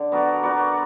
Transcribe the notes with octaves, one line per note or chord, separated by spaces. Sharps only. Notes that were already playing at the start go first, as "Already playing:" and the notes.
Already playing: D3
B3 F#4 A#4 D5
B3 F#4 A#4 D5